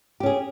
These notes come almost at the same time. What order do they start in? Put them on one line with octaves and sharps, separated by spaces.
G4 C#4 G#4